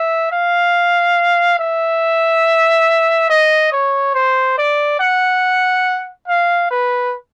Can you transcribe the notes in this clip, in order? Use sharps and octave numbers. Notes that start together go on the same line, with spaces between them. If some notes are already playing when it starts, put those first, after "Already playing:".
Already playing: E5
F5
E5
D#5
C#5
C5
D5
F#5
F5
B4